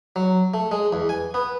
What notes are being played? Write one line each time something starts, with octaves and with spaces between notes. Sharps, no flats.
F#3
A3
G#3
E2
G#5
B3